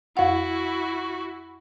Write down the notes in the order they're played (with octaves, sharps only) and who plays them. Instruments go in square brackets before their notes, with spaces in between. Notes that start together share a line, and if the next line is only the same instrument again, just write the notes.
[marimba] F2 F#5 [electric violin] E4 F#4